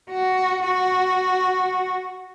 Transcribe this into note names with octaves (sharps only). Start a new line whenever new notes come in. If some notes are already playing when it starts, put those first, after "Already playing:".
F#4
F#4